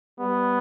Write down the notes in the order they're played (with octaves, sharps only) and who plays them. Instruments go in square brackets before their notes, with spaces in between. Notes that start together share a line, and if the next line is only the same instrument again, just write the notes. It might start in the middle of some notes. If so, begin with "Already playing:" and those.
[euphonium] G3 [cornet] B3